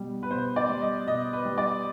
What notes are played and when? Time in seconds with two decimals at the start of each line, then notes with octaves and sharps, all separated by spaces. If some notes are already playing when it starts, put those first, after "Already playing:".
Already playing: B2 G3
0.23 B4
0.31 B2 C5
0.56 D5
0.69 G3
0.82 D#5
1.07 B2 D#5
1.33 B4
1.45 G3
1.58 D5